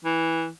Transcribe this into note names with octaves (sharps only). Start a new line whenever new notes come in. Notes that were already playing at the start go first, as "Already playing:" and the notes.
E3